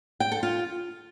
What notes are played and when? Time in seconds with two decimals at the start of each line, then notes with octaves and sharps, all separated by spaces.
0.20 G5
0.32 A4
0.43 F4